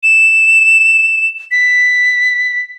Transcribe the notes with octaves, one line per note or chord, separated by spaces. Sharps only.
E7
B6